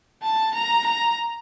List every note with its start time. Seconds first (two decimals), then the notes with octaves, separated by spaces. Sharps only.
0.23 A5
0.54 A#5
0.86 A#5